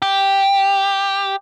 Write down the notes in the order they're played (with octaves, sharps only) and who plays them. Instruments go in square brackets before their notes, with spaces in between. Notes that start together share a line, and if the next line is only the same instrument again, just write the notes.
[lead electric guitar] G4